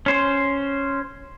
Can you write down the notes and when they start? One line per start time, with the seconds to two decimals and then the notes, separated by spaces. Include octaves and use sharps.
0.06 C#4 C5